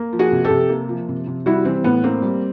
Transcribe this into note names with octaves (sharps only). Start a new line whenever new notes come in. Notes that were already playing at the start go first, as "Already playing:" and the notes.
Already playing: A#3
F3
F#4 G#4
C3
G4 A4
C3
A#3
F3
C3
C3
G3 E4 F#4
E3 C4
A2 B3
A#3 C4
G3